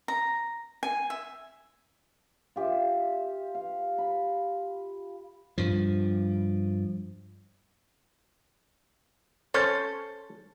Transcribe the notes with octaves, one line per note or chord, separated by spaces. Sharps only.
A#5
G#5
E5
F4 G4 E5
F5
B5
G2 F3
C#4 A4 C5 C6